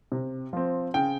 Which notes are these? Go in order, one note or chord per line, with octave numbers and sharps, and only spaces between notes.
C3
F3 C4
C#3 G5